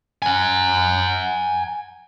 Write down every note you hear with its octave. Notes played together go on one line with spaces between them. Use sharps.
F#5 G#5